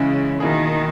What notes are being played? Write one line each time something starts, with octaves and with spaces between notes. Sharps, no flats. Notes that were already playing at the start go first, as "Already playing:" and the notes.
Already playing: C#3 E3 G#3 C#4 E4
B2 D#3 A#3 E4 G#4